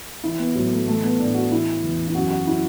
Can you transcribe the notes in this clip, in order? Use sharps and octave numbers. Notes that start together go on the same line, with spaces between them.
E3 E4
B3
A2 F#3
A3
E3 A3
B3
A2 D4
F#4
E3 E4
E2
E4
F#2 F#4
F#4
F#3 E4